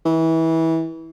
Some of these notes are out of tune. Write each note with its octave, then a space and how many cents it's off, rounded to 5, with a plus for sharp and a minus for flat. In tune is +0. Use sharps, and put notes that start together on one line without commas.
E3 -25